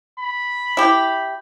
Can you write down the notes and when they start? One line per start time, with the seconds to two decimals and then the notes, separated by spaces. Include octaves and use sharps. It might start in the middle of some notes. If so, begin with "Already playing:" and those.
0.20 B5
0.77 E4 G4